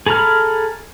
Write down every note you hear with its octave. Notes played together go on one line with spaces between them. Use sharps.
G#4 A4 A#5 B5 F6